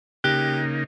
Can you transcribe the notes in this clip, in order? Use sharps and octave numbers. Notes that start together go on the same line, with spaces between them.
C#3 A#3 D#4 G4 F#6